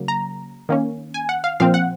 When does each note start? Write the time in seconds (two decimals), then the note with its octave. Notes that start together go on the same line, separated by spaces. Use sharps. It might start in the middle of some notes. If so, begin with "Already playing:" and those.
Already playing: C#3 F#3 A#3
0.08 A#5
0.69 D#3 A#3 C#4
1.14 G#5
1.29 F#5
1.44 F5
1.60 A#2 F3 C4 F5
1.74 F#5